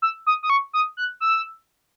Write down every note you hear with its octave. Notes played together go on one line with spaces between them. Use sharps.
E6
D#6
D#6
C#6
D#6
F#6
E6